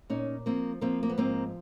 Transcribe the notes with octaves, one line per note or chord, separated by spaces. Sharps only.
A#2 C#4 D#4
F3 A#3 C4
F3 A#3 C4
A#3
B3
G#2 A#3 C4